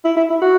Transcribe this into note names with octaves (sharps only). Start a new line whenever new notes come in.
E4
E4
E4
F#4